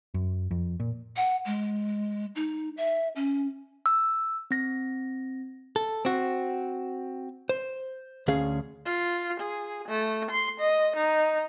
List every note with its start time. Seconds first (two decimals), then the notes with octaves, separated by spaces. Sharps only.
0.14 F#2
0.51 F2
0.80 A#2
1.17 F#5
1.46 G#3
2.35 D#4
2.77 E5
3.16 C#4
3.86 E6
4.51 C4 A#6
5.76 A4
6.05 C4 F#4
7.49 C5
8.28 D2 C#4 G#4 F5
8.86 F4
9.40 G#4
9.88 A3
10.31 C6
10.60 D#5
10.96 D#4